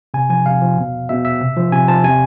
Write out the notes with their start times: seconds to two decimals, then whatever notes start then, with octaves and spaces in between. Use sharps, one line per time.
0.14 C3 G#5
0.30 F3 G#5
0.46 C3 F5
0.62 F3
0.78 B2
1.09 B2 E5
1.25 E5
1.41 C3
1.57 F3
1.72 C3 G#5
1.88 F3 A5
2.04 C3 G#5